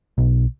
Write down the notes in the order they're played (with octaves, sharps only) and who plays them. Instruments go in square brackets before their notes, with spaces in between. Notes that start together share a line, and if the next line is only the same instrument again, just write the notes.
[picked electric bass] B1